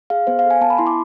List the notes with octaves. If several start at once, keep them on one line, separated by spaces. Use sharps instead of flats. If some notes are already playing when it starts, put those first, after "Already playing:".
G#4 F5
B3 C5
F5
A4
G#5
B3 A5
B5
E4 C6
D6